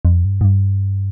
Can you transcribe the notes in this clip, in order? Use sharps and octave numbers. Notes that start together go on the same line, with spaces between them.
F2
G2
G#2
G2